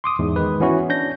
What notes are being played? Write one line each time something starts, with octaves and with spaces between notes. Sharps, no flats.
C6 D6 D#6
E2 G#2
D#3 G#3 B4
E3 B3 C#4 E4 F#4
C#4 D4 G6 A#6